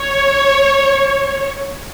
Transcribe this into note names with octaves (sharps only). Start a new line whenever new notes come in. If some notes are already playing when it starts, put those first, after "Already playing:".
Already playing: C#5